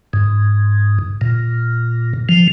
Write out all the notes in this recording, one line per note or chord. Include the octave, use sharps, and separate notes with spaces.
G#2
A#2
F3